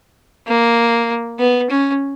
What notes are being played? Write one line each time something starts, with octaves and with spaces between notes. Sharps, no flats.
A#3
B3
C#4